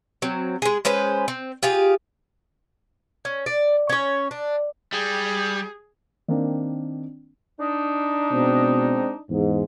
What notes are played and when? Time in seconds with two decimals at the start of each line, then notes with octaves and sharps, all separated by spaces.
0.22 F#3 C4
0.62 G#3 G#4
0.85 G#3 C#4 B4 C5
1.28 C4
1.63 F4 G4 G#4 F5
3.25 C#4
3.46 D5
3.89 C#4 C#5
4.31 D4
4.93 G3 G#4
6.28 D#3 A#3 C4 D4
7.60 D4 D#4
8.31 B2 G#3 C4
9.30 E2 G#2